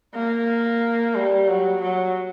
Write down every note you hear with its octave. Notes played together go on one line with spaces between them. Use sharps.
A#3
G3
F#3
F#3